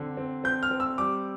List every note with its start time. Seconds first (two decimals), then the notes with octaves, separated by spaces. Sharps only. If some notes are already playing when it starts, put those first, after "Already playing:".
Already playing: D3 C4
0.17 C4
0.44 C4 G6
0.63 F6
0.71 C4
0.80 E6
0.98 G3 D6